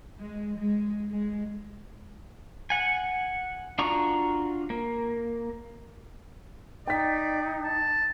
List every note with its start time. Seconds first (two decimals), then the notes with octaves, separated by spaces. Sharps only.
0.19 G#3
0.58 G#3
1.10 G#3
2.70 F#5 G#5
3.79 D4 F4 F#4 A#5 C#6
4.70 A#3
6.87 D#4 D5 G5 B6
7.64 A5